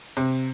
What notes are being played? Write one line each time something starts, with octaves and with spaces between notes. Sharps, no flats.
C3